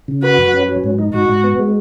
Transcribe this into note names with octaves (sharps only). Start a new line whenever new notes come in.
C#3
F#4 B4
F#2
C#4
F#3
G#2
D#4
G#2 F#4
G#2
B3
G#3